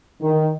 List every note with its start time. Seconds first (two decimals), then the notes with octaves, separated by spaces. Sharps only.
0.22 D#3